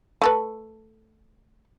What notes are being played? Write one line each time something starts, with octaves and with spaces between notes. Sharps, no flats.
A3 A4 B4